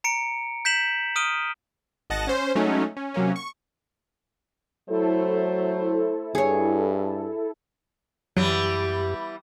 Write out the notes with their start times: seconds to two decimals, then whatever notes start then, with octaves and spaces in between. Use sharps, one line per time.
0.04 A#5 C#7 D7
0.65 G6 B6 E7 F#7
1.16 D#6 F6 D7 D#7 G7
2.10 G#1 D#5 F#5 A5 A#6
2.27 C#4 C5
2.55 F#3 G#3 A3 C#4 D#4
2.97 C#4
3.14 C3 F#3 A#3 C#4
3.36 C#6
4.90 F#3 A3 E4 A4 C5
6.35 G2 G#4 C#5
8.37 F#2 E3 F#3 G3 B3 G4